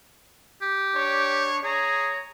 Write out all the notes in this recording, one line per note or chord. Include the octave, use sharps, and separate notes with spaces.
G4
D4 C#5
G#4 C#5 A#5